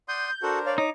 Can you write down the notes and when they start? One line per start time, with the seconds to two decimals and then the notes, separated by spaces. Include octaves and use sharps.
0.08 D5 F#5 C6 D#6 G6
0.43 D4 F#4 A4 A#4 C5 F#5
0.66 C#5 D5 F5
0.78 D#4 D6